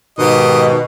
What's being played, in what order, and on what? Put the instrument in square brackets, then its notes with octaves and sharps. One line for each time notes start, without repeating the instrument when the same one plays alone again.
[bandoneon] G#2 [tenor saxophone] B2 [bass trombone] D#3 [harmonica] G4 D#5